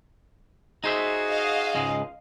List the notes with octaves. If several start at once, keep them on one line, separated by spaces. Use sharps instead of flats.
D#4 F#4 G#4 C5 E5
D#5 F5
C#2 G#2 G#3